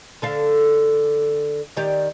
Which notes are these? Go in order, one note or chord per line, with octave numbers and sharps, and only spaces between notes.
D3 A4 F5
D#3 G4 D5